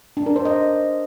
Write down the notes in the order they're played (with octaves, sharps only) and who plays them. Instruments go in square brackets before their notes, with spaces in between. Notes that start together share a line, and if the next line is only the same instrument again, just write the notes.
[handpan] D4
A#4
C5
D#5